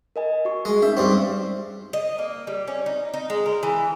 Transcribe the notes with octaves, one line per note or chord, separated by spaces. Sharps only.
A#4 D#5 G#5
F#4 C#6
G#3
C#4 D#4 E5
G2 G3 C4 C#6
D#5
A#3
G3
C#4
D#4
D#4
G#3
A#4
E3